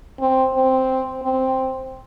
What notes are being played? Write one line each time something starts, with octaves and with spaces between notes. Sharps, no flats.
C4
C4
C4